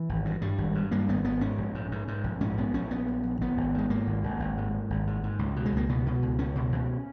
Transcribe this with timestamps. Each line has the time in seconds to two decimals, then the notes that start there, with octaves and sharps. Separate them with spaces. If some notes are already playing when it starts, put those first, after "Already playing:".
Already playing: E3
0.09 G#1
0.25 G2
0.42 G2 G3
0.58 G#1
0.75 G2
0.91 G2 A#3
1.09 G#1 B3
1.24 G#1 B3
1.41 G#2 C#4
1.58 A#1
1.75 G#2
1.92 G#2
2.08 G#2
2.24 A#1
2.41 G#2 C#4
2.57 A#1 B3
2.74 A#1 C#4
2.91 A#1 B3
3.08 A#1
3.23 A#1
3.41 G#1 B3
3.57 G#1
3.74 G#2 G#3
3.90 G#2 A#3
4.07 G#1
4.24 G#1
4.40 G#1
4.57 G#2
4.73 G#2
4.90 G#1
5.07 G#2
5.23 G#2
5.39 C#2
5.56 B2
5.66 G#3
5.73 C#2 A#3
5.89 B2 B3
6.06 B2
6.23 C#2
6.38 C#2 C#4
6.56 B2
6.72 C#2